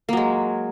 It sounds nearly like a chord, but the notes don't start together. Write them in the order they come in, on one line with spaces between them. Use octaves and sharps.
A#3 F#3 G#3